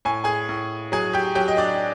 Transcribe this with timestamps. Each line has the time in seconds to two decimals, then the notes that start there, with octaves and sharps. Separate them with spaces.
0.05 A2 G#5
0.24 G#4 G#5
0.49 A2
0.92 F#3 G#4 G#5
1.13 G4 G5
1.35 F#3 G4 G5
1.48 D#5
1.57 D4 D5